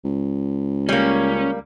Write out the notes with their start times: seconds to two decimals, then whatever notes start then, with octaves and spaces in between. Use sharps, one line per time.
0.04 C#2
0.89 G3 A#3 C#4